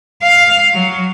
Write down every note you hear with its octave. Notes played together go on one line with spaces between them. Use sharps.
F5
F#3